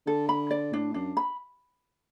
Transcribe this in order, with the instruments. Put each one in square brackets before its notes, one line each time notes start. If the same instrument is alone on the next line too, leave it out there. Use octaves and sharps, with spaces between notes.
[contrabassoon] D3 [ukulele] A4
[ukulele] B5
D5
[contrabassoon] A2 [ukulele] D4
[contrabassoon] F#2 [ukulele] D4
[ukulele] B5